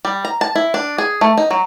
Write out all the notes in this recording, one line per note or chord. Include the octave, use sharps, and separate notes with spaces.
G3
A#5
A5
E4
D4
G#4
A3
D#4
F#3